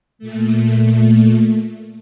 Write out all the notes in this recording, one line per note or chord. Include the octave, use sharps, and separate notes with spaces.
A#2 A3